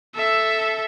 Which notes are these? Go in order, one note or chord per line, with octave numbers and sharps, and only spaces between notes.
A4 E5